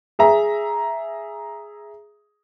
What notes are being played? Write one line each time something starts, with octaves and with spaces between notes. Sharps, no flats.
G#4 E5 A#5